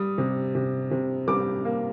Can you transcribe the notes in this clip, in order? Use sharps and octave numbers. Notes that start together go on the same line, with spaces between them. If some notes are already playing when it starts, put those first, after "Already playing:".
Already playing: G3 D#6
C3
C3
C3
G3 D6
A#3